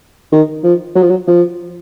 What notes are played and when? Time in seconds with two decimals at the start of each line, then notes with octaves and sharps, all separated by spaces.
0.32 D#3
0.63 F3
0.95 F#3
1.02 F3
1.10 F#3
1.27 F3